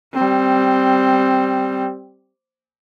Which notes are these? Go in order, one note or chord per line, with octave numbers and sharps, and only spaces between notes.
G3 C4